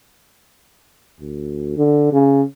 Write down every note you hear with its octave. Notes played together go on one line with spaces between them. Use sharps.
D2
D3
C#3